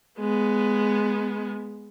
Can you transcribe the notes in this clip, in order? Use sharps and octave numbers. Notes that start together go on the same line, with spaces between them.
G#3 B3